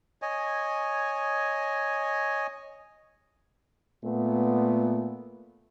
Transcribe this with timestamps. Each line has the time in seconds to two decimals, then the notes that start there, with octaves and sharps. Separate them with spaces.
0.22 C#5 D#5 G#5
4.04 A#2 A3 B3